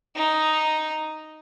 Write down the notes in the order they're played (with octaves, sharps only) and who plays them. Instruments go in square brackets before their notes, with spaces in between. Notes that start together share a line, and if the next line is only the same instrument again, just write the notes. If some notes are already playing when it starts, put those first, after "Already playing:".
[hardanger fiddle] D#4